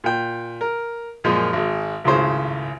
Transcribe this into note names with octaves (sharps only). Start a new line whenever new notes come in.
A#2 G5
A#4
F#2 A#2 F3 G#3
G#1 G#3
G#1 C#2 F#2 A2 C#3 C5